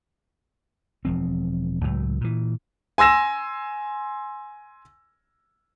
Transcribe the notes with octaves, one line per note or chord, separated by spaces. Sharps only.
E1 F3 C4
C#2 A2 F#3
A#2 E3
G#5 C6 E6 A#6 E7